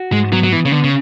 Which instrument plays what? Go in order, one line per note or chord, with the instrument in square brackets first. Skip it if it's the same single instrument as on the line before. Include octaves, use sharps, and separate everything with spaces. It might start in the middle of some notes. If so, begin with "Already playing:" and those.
Already playing: [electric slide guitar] F#4
[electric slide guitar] G#2 [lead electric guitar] G#3
[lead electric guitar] F#3 [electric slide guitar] B3
[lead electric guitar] F#3
[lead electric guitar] E3 [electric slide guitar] B3
[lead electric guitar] C#3
[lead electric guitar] D3 [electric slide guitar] B3
[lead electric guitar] C#3